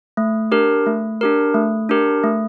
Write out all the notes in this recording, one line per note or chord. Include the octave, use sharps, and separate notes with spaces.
A3
D4 G4 A#4
A3
D4 G4 A#4
A3
D4 G4 A#4
A3